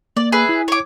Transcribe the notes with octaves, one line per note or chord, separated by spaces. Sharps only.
A#3 D5
G#4 B4 E5
E4
C#5 D6